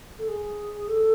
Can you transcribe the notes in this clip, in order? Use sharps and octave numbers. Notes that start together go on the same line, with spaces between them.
A4
G#4
A4